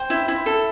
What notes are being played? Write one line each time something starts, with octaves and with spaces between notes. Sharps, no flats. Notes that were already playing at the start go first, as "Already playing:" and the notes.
Already playing: C5 G5
E4
E4
A4